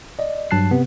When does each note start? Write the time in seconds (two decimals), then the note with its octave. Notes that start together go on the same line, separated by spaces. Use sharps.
0.19 D5 D#5
0.51 G2 F#3 A5 F#6 C7
0.71 C3 B3